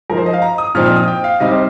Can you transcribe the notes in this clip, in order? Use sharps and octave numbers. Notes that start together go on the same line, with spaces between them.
F3 D#4 A#4
C5
D#5
F5
A#5
D#6
A#2 F3 C4 D#4 F6
F6
D#6
G5
F5
C3 G3 C4 D#4 D#5
C5